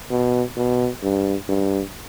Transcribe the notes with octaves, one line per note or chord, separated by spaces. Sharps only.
B2
B2
G2
G2